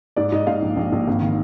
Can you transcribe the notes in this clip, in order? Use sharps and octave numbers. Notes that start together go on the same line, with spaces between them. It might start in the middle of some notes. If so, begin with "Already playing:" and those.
G#2 D5
G#2 D#5
G#2 F5
A#1
A#1
A#1
G#1
D#3